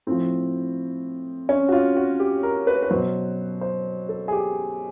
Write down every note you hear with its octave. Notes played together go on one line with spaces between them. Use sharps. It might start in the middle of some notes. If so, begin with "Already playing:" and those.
A2 F3 C4
C#4
F#4
F4
F#4
G4
A#4
B4
B4
B2 F#3 C5
C5
A4
G#4
G4